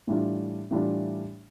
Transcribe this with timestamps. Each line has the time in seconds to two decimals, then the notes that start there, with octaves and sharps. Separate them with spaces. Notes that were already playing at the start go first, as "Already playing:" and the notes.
0.07 A2 E3 G3 D4 F4
0.71 A2 E3 G3 D4 F4